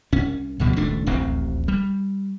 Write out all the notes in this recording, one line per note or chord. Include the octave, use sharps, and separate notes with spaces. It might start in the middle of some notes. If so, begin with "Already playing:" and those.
C2 C#4
D2 B2 F3 G3
D#1 C#2 A3 D4
D1 A1 D#2 C4
G3